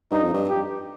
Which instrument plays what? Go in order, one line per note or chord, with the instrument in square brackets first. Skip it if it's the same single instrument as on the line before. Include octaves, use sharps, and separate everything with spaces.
[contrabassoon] G2 [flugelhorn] D#4
[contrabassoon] F2
G2
[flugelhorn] G4